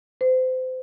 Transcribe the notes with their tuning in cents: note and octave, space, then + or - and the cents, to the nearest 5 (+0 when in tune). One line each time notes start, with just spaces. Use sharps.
C5 -30